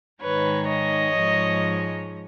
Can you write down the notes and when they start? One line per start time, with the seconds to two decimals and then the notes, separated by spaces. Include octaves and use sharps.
0.22 G#2 D#3 G#3 B4 C#5
0.68 C#5 D#5
1.15 G#2 F3 G#3